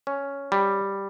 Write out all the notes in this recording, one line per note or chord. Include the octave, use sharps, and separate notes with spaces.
C#4
G3